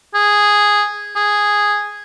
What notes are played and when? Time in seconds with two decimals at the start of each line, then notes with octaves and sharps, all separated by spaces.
0.14 G#4
1.16 G#4